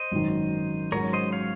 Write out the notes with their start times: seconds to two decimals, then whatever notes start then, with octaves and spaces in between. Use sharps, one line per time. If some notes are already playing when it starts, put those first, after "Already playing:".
Already playing: C5 D#5
0.12 G#1 F#2 D#3
0.92 G#2 F#3 C#4 A#4 C#5
1.13 C5 D#5
1.33 C#5 F5